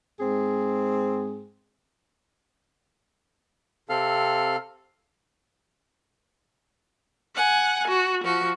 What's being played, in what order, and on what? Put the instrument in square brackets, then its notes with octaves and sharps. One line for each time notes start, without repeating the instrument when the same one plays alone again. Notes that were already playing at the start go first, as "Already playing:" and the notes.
[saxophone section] G#2 C4 G#4
[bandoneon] C3 C4 A4 F5 F6
[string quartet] F#5 G#5
F#4
F3 F#4